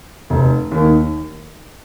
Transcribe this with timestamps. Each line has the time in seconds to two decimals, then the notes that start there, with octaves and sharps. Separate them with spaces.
0.30 F1
0.71 D#2 D#3